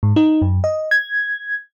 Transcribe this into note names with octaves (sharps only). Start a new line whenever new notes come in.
G#2
D#4
F#2
D#5
G#6